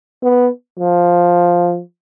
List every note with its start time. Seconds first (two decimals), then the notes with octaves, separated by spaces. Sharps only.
0.22 B3
0.79 F3